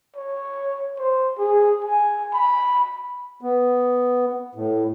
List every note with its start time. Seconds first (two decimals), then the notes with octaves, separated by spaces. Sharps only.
0.16 C#5
0.99 C5
1.39 G#4
1.85 G#5
2.34 B5
3.41 B3
4.55 A2